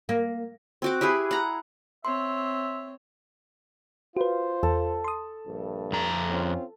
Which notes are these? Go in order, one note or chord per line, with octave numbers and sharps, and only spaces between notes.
A#3
C4 F#4 D6
E4 G4 G#4 B4
F#5 A#5
C4 C#5 E5 C6
F4 F#4 B4 C5
E2 A4
C6 D#6
A#1 G2
F2 A#5
C4 C#4 F4